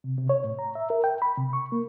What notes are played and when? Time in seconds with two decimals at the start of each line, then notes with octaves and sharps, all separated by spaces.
0.04 C3
0.18 C3
0.29 C#5
0.44 A2
0.59 A#5
0.75 E5
0.90 A#4
1.04 G5
1.22 B5
1.37 C3
1.53 C#6
1.72 A#3